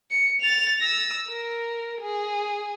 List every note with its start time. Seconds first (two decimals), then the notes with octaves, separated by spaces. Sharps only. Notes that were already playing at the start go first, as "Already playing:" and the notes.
0.11 C#7
0.41 A6 F7
0.81 E6 A#6
1.28 A#4
2.01 G#4